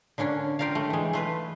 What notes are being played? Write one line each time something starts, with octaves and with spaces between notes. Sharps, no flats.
D3 A#3 C#4 D4
F4 G4 A#4 D5 F5
A3
E3 G#3
A3 F4 B4